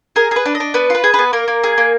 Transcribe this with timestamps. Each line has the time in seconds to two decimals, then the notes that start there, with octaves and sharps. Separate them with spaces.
0.16 G#4 A#4
0.31 G#4 B4
0.45 D4
0.55 D#5
0.60 D4
0.74 B3 B4
0.90 F4 B4
1.04 G#4
1.14 B4
1.19 B3
1.33 A#3 A#4
1.48 A#3
1.64 G#4
1.78 A#3